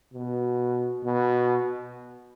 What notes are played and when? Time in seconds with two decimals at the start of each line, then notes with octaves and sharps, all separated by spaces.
0.14 B2
1.04 B2